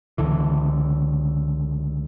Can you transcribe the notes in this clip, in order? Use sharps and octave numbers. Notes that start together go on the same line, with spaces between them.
C#2 D3 E3